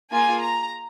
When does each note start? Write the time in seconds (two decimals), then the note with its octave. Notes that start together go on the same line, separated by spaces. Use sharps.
0.12 A#3 F4 G#4 G#5
0.40 A#5